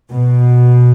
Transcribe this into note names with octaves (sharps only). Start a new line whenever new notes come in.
B2